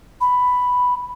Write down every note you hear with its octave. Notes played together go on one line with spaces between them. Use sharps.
B5